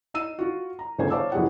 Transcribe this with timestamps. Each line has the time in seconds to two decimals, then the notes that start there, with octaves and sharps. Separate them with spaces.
0.14 D#4 E6 D#7
0.39 F4 F#4
0.79 A#5
0.98 G1 D2 C#3 F4 C5 G#5
1.10 C5 C#5 F5 A5 D6 E6
1.32 F#1 E3 F3 G4 G#4 F#5